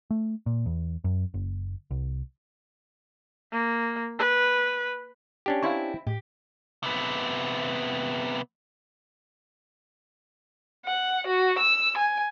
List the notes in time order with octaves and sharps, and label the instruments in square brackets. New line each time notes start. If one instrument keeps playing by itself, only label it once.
[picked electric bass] A3
A#2
E2
F#2
F#1
C2
[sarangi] A#3
B4
[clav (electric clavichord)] C#4 D4 G4
[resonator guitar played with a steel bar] C4 E4 [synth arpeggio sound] F5 C6 C#6
[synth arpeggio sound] A2 [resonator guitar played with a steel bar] G4
[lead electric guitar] C3 B3
[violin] F#5
F#4
E6
G#5